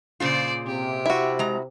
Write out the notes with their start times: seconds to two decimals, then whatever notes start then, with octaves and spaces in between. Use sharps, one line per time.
0.20 A#2 C#3 F4 C5 D5
0.66 C3 G4
1.06 E4 F#4
1.39 G#3 A#5